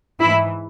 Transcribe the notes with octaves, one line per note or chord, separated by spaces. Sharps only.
G#2 E3 E4